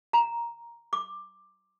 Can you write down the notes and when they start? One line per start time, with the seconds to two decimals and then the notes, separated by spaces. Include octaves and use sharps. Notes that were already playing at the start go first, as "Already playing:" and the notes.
0.13 A#5
0.93 D6